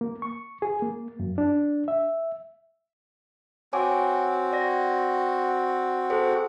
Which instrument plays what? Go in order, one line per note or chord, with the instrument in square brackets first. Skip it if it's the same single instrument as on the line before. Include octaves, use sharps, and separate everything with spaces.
[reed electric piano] A#3
C#6
G#4
A#3
F#2
D4
E5
[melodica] C4 F#4 [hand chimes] C#5 G#5 D6
[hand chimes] D5 A#6
G#4 A4 C5